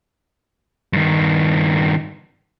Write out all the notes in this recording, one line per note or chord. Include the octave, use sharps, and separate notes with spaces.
G2 D#3